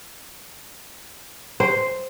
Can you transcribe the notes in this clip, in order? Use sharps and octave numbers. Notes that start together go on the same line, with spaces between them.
C5